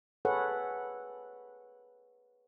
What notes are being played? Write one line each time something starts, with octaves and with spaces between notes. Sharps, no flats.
G#4 A4 B4 C#5 F#5